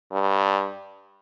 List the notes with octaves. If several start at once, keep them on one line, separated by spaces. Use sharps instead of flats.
G2